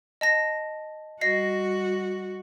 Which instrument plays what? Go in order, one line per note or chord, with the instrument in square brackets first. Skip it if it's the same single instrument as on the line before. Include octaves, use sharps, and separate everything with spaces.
[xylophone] D#5 A5 A#6
[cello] G3 F#4 [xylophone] D#5 A#6 C7